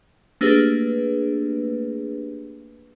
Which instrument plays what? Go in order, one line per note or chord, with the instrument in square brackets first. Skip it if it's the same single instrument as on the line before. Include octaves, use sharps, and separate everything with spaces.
[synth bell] A3 A#3 D4 G4 G#4 B4